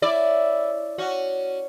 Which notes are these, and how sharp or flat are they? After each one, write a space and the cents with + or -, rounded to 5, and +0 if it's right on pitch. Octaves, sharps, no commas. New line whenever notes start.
C#4 +0 E4 +0 D5 +0
C#4 +0 F#4 +0